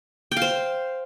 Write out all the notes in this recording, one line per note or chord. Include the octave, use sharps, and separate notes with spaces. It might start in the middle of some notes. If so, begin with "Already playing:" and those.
G5
F5
C5